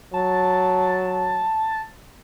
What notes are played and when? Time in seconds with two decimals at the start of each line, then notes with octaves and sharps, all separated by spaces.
0.14 F#3 A5